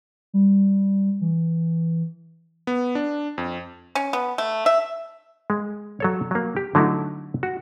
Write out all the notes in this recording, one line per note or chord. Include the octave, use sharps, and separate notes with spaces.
G3
E3
B3
D4
F2
C#4
B3
A3
E5
G#3
F#3 A4 C#5
F#3 A#3
G4
D3 F#3 A3 D#4 E4
F#4